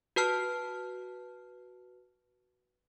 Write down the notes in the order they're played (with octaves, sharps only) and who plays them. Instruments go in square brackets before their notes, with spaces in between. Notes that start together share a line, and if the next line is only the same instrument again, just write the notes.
[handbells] F#4 B4 A5 F6